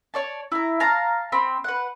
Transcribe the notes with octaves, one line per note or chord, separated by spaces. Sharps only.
C#5 D5 A5
E4 A#5
F5 A5 A#5
C4 B5
B4 F#5